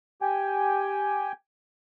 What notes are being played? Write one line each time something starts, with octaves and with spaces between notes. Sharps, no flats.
G4 G5 G#5